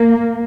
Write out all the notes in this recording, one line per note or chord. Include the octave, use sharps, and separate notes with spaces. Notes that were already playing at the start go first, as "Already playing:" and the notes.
Already playing: A#3